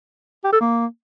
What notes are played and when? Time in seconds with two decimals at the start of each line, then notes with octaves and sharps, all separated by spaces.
0.44 G4
0.52 A4
0.61 A#3